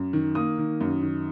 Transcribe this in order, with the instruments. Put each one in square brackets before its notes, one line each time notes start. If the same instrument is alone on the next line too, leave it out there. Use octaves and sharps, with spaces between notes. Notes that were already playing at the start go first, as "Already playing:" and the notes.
Already playing: [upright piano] F#2
D#3
A#3 D#6
D#3
F#2
D#3